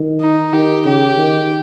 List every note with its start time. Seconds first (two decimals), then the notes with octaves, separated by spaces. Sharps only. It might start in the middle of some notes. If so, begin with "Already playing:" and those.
Already playing: D#3
0.21 D#4
0.53 D#3 G4
0.85 C#3 G4
1.18 D#3